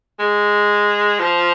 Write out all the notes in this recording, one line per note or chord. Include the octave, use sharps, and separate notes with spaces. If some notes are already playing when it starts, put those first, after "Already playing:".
G#3
F3